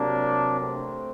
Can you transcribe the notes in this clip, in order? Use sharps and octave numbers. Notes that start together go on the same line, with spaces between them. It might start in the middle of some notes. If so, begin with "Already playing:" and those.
Already playing: C3 F#3 A#3 D4
A3 C4